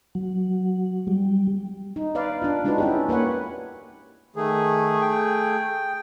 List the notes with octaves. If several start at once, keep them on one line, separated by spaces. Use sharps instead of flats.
F#3
G3
D#4
B4 D5 F5
D4 F4
G#3 D4 D#4 F4 F#4 B4
C#4 E4 G4
A#3 B4 C#5 F#5
D#3 A3 G#4
G5